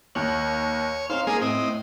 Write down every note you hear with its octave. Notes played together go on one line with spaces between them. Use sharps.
D#2 C#5 F#7
C4 C#4 D#4 C5 F5
G#3 A#3 G#4
A2 C4 D#5